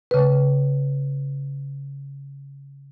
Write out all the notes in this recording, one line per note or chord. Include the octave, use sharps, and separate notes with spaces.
C#3 B4